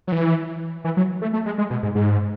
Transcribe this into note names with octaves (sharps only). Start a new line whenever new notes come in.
F#3
E3
E3
F#3
A3
A3
G#3
G#3
B2
G#2
G#2